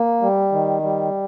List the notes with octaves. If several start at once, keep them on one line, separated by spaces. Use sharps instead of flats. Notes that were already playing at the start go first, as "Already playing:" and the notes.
Already playing: A#3
G3
D#3
G3